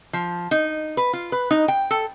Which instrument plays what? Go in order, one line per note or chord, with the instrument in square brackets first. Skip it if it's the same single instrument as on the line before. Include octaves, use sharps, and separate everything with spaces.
[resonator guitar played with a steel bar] F3
D#4
B4
F4
B4
D#4
G5
A4